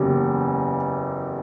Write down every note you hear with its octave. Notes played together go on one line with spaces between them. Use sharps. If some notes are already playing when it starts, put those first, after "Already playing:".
Already playing: F#1 E2 C#3 G4